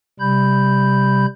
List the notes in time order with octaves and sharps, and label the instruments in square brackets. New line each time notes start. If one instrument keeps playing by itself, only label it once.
[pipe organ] C3 G3 B5 G6